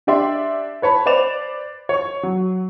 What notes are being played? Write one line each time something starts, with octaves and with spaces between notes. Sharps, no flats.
D4 G4 D5 E5 C6
B4 C#5 A5 B5
B4 C5 D5 E7 F7
C#5 C#6
F#3